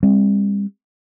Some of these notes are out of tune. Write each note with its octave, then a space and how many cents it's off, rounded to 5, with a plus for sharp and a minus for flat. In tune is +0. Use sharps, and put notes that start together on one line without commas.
G3 +45 C4 +25